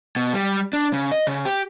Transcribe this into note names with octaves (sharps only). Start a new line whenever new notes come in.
B2
G3
D4
C#3
D#5
C#3
G4